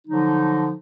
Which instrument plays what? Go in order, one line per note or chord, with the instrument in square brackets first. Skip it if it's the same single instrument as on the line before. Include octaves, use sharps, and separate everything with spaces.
[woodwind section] D3 F3 F#3 D#4